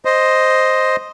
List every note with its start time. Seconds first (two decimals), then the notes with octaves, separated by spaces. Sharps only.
0.05 C5 D#5